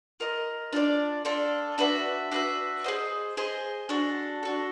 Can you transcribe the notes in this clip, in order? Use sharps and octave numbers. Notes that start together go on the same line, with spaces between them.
F4 A#4 D#5
D4 F4 A4 D5
D4 F4 A4 D5
D4 F#4 B4 E5
D4 F#4 B4 E5
G#4 C5 D#5
G#4 C5 D#5
D4 F#4 A4
D4 F#4 A4